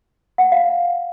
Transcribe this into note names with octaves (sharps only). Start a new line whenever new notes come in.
F#5
F5